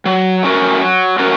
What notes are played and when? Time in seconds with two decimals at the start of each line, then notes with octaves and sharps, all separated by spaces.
0.05 F#3
0.43 A3 C#4 F#4 A#4
0.81 F#3
1.19 A3 C#4 F#4 A#4